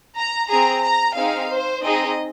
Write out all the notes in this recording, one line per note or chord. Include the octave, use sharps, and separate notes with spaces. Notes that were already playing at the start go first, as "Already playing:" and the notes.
A#5
C4 G#4 A#5
A#5
C4 D#4 G#4 F5
C5
C4 D#4 G#4 D#5